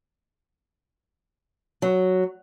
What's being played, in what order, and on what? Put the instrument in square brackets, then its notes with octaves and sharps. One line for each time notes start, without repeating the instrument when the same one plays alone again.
[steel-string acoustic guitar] F#3